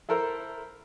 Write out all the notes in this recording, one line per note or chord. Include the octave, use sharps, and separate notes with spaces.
E4 A4 A#4 C5